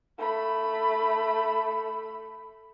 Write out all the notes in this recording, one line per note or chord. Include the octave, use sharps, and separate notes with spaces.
A3 B5